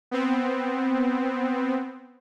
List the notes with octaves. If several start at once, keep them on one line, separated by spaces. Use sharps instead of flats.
B3 C4